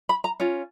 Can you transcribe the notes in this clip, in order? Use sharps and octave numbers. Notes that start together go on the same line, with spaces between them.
B5
A#5
C#4 F4